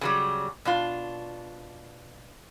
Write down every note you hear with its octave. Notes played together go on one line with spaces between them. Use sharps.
C#3 F#3 G3
B2 D4 F4